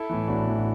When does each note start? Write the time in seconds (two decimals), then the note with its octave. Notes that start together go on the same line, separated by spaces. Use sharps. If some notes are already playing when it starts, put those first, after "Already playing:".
Already playing: E4 A4
0.10 A2 E3
0.27 A1 D4 F#4
0.46 A2 E3
0.58 F#4